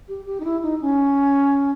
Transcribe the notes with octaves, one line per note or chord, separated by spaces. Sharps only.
G4
G4
D#4
E4
D#4
C#4